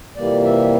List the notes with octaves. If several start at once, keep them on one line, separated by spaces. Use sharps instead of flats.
F2 C3 E3 G3 A#3 D5
E5